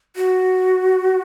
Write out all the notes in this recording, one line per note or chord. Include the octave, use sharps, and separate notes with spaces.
F#4